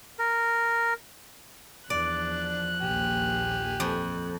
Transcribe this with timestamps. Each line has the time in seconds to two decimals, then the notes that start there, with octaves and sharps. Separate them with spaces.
0.19 A#4
1.90 E2 F3 D4 D5 F#6
2.81 A#1 D#2 G4 G#5
3.80 F2